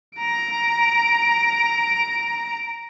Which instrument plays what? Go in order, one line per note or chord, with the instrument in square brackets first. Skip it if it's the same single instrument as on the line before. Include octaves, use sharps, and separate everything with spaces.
[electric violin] A#5 D7